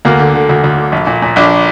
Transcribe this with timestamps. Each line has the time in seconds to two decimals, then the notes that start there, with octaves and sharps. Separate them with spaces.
0.05 D2 A#3
0.19 D3
0.34 D3
0.49 D2
0.64 D2
0.78 D3
0.92 A#1
1.07 A#2
1.22 A#2
1.36 A#1 D4